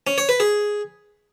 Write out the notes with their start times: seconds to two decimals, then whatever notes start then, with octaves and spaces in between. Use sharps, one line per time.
0.07 C#4
0.18 C#5
0.29 B4
0.40 G#4